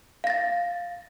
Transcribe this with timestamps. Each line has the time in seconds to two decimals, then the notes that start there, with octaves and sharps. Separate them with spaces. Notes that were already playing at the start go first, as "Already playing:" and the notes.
0.24 F5
0.27 A#6
0.30 A6